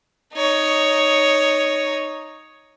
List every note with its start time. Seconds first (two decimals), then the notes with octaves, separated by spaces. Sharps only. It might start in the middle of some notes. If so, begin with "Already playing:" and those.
0.34 D#4 C#5